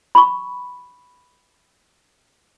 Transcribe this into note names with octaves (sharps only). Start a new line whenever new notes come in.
B5 C#6